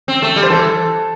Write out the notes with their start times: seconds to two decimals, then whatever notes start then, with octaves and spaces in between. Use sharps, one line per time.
0.08 C4
0.22 A3
0.36 G3
0.42 C5
0.50 E3 A4